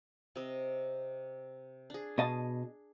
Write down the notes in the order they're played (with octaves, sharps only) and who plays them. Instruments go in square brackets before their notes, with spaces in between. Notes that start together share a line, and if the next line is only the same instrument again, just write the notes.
[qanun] C3 D#5
D4 G#4
[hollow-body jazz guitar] B2 D#5 A5